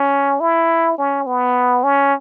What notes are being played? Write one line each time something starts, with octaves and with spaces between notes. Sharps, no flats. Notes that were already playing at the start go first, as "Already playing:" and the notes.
Already playing: C#4
E4
C#4
B3
C#4